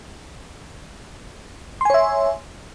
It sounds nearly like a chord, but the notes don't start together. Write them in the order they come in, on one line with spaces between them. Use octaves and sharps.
C6 G#5 C#5 E5